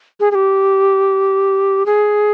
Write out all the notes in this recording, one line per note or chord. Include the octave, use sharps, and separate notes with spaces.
G#4
G#4
G4
G#4